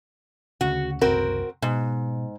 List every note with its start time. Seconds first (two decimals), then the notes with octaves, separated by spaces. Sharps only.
0.61 D2 C#3 F#4
1.01 F#1 C2 C4 F#4 A#4
1.62 G#2 B2